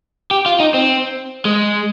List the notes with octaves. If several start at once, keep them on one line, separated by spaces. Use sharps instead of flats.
G4
F4
D#4
C4
G#3